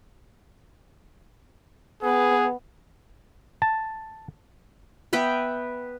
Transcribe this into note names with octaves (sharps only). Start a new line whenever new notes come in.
B3 G#4 B4
A5
B3 B4 E5 G5